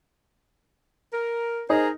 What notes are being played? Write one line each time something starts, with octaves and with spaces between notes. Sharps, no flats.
A#4
D#4 G#4 A#4 C5